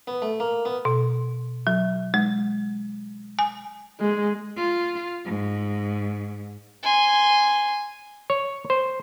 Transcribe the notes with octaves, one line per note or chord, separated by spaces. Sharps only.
B3
A3
A#3
B3
B2
F#3
G#3
G#5
G#3
F4
G#2
G#5 C6
C#5
C5